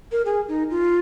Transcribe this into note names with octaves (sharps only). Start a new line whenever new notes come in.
A#4
G#4
D#4
F4